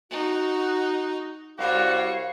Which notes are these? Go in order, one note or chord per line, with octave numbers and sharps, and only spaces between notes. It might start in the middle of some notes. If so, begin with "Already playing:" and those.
D#4 F#4
C2 G3 F#4 C5 C#5 F5